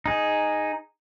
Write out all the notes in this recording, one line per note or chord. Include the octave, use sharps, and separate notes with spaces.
D#4 G#4